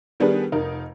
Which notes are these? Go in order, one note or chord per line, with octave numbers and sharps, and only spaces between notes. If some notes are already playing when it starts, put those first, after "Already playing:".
D#3 G3 B3 D4 G#4 B4
F1 D#4 A#4